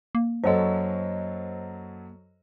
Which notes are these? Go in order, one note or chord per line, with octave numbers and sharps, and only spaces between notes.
A#3
F#2 F#3 A4 C5 D#5